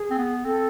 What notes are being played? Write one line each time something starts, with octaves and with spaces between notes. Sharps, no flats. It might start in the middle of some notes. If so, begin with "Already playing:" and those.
Already playing: G#4
C4
B3
C4 A4